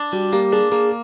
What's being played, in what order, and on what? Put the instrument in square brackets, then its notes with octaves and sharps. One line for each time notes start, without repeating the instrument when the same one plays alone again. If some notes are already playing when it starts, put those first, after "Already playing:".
Already playing: [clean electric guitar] D4
[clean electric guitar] G3 [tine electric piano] F#4
[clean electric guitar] A#3 [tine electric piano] G4
[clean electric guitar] D4 [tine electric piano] G#4
[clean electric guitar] A#3 [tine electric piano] G#4